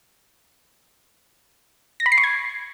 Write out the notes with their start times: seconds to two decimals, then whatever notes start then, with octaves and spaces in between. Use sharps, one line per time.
2.00 A#6
2.06 B5
2.12 C7
2.18 C#6
2.24 G#6